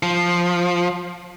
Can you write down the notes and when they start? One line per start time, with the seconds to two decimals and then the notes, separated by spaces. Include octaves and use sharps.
0.03 F3